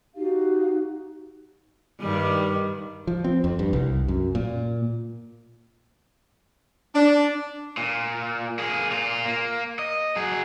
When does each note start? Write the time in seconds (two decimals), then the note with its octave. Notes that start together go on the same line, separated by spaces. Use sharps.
0.15 D#4 F#4 G4 F5
2.00 G2 D#3 G3
3.07 F3
3.24 C4
3.44 F2
3.59 G2
3.73 C2
4.08 F#2
4.35 A#2
6.95 D4
7.77 A#2
8.59 A#3 G#4
8.91 A#2 F4
9.25 A#3
9.79 D#5
10.16 F#3 G#4